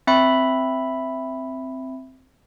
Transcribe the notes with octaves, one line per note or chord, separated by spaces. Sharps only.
C4 E5 B5